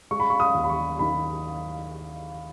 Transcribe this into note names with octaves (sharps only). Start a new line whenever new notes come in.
G#3 C#6
B5
C#6
D#6
D#2
B5
C#6
D#3 B5